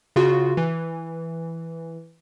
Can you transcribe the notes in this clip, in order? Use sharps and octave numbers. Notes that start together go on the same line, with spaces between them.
C#3 F4 F#4
E3